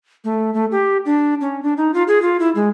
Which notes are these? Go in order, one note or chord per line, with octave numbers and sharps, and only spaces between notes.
A3
A3
G4
D4
C#4
D4
D#4
F4
G#4
F4
E4
G#3